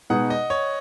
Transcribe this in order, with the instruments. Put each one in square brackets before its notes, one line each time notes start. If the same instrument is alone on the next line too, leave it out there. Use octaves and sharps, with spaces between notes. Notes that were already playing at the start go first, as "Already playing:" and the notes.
[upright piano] B2 G#3 D#4 G#4 B4 [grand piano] F#5
[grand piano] D#5
C#5